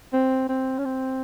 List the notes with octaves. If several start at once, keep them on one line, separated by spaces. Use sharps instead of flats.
C4
C4
C#4
C4